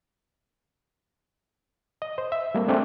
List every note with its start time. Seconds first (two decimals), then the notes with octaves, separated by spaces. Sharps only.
2.02 D#5
2.18 C5
2.32 E5
2.55 G3 A3 A#3 C4
2.68 G#3 A3 C4 D4